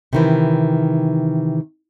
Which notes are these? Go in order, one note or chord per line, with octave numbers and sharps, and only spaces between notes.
C3 D#3 E3